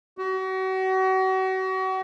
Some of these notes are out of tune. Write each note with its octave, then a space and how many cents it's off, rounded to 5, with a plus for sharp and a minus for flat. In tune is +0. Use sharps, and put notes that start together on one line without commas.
F#4 +35